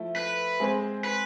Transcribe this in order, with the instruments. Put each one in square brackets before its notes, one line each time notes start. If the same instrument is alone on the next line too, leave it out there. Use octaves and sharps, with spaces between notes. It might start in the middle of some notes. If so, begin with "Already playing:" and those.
Already playing: [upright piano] F3 A3 E4 A4
[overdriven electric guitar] B4
[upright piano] G#3 C4 G#4 C5
[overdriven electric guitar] B4